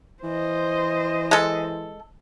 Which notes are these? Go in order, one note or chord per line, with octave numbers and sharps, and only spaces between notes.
E3 C5 D#5
G#3 A4